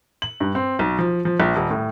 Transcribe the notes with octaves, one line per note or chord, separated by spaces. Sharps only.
F#7
G2
C4
B1
F3
F3
A#1
D#1
A2